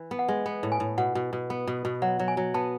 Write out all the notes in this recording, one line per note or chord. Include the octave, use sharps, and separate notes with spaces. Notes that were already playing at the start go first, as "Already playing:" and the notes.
Already playing: E3
B3
F#5
G#3
B3
A2
G#5
A2
B2 F#5
B2
B2
B3
B2
B2
F#3 F#5
F#3
G#5
F#3
B3 A5